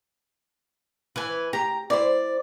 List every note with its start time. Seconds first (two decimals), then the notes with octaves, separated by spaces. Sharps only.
1.16 E3 B4 G#5
1.53 G4 A#5
1.90 E4 C5 D5